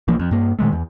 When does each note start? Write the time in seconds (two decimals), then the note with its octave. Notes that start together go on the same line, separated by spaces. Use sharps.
0.08 B1 E3 F3 A#3
0.20 F2
0.31 G2 A#3
0.59 A#2 D#3 G#3 A3
0.72 E2